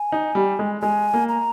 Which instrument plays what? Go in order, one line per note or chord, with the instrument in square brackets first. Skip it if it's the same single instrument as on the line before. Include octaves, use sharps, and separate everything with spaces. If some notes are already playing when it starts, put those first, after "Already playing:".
Already playing: [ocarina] G#5
[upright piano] D#4
G3
G#3
[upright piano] G#3 [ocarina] G#5
[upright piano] A#3
[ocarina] A#5